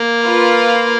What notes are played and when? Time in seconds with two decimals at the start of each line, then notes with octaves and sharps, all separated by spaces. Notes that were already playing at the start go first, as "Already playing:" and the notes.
Already playing: A#3
0.23 F4 B4 F5